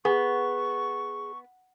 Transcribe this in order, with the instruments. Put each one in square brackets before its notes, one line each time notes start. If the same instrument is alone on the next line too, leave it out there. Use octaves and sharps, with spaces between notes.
[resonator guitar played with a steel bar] B3 [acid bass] G#4 [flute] C#6